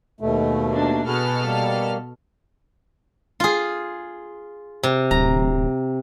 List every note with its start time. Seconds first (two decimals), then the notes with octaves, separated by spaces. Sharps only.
0.21 D#2 B2 A3
0.70 A#3 D4
1.06 B2 F#4 G#4 A4 B4 F6
1.44 G3 A#3
3.40 F4 G#4
4.83 C3
5.11 D1 A#5